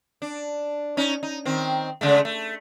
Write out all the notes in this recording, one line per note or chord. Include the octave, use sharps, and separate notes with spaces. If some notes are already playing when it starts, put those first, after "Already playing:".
D4
C#4 D#4
D#4
D#3 C4
C#3 G#3 A3
A3